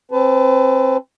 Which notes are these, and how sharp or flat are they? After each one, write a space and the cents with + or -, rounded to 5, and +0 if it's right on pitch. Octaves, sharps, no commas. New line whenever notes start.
C4 +20 B4 +35 A5 -10